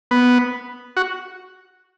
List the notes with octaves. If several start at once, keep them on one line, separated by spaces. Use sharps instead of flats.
B3
F#4